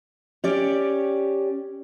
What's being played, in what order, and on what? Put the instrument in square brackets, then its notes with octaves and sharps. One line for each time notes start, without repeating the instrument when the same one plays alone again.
[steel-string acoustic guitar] C#4 G4 D5